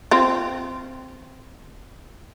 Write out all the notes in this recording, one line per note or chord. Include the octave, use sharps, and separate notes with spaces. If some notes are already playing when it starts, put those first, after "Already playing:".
C4 F4